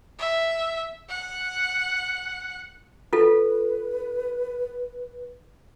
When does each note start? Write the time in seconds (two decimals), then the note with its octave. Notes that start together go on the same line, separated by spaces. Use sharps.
0.18 E5
1.09 F#5
3.13 F4 A4 B4